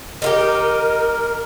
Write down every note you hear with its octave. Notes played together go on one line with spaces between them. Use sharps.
D#4 F4 G4 A#4